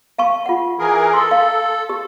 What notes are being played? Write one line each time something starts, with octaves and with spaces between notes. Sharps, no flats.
F5 A5 C#6
F4 F#5
E3 G#4 A#4
A4 C6
F5
G4